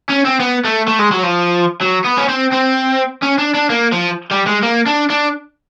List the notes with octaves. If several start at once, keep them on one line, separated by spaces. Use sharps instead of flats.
C#4
C4
B3
A3
A3
G#3
F#3
F3
F#3
B3
C#4
C4
C4
C#4
D4
D4
A#3
F3
G3
G#3
A#3
D4
D4